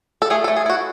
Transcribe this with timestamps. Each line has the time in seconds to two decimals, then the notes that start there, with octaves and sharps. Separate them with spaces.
0.22 A4
0.30 A3 G#4
0.44 A4
0.48 A3
0.56 G#4
0.66 E4 F#4